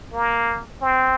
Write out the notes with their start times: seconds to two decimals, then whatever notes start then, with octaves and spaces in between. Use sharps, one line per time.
0.13 A#3
0.81 C4